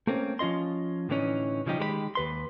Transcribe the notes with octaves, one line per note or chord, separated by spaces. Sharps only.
A3 A#3 C4 C#4
F3 C#4 F4 D#5 C6
A2 D3 E3 A3 C#4 D#4
C#3 F3 G3 D#4 G4
D#3 G#3 G4 B4 B5
D#2 B4 C6